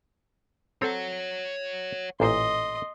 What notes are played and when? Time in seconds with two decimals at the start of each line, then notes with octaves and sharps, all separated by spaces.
0.82 C4 A4 C#5 F#5
2.20 A1 A#2 C5 D#5 C6